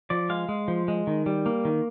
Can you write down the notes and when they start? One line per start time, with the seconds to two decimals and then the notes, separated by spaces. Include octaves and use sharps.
0.10 F3 D5
0.29 G#3 F5
0.49 G#3
0.68 F3
0.88 G#3
1.07 D#3
1.26 G3
1.46 A#3
1.65 D#3